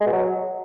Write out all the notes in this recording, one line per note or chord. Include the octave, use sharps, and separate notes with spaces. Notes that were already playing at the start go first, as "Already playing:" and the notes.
G#3
B2
F#3